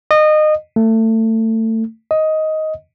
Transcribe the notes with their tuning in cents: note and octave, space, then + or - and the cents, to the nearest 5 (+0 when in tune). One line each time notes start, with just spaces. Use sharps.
D#5 -25
A3 +25
D#5 +10